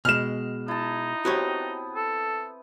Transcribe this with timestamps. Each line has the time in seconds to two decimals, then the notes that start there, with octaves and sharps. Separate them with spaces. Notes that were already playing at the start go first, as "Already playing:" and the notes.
0.05 B2 G#3 F6 E7
0.68 D#4 E4 A5
1.25 B3 C4 F#4 G4 C#5
1.96 A4